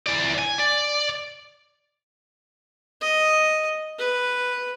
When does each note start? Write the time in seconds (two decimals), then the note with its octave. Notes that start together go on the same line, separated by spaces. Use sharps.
0.07 E3 D5
0.38 G#5
0.58 D5
3.01 D#5
3.99 B4